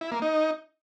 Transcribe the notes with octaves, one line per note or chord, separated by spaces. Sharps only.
E4
A#3
D#4